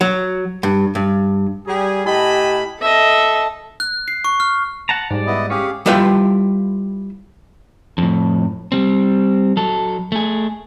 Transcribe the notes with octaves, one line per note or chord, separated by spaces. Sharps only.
F#3
G2
G2
G3 G#4
A2 G4 D#5 G#5 A5 B5
A4 D#5 E5
F#6
C7
C#6
F6
F#5 A5 A#5
G#2 G3 D5
B3 E4 D#5
C#4 G4 G#4 C#5 F5
G3 E4 F4 B4 F5 G5
F2 A2
G3 C4
F#3 A4
A3 G#4